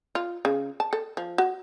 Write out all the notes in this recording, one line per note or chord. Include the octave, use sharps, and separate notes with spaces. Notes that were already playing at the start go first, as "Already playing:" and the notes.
F4
C#3
A5
A4
F3
F#4